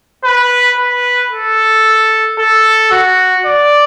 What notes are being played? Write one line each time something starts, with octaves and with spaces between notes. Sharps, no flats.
B4
B4
A4
A4
F#4
D5